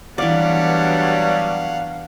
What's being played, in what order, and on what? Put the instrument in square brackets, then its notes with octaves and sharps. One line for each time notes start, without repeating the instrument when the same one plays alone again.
[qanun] E3 D5 [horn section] F#3 G3 [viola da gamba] B3 D4 [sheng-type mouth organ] F5 F#5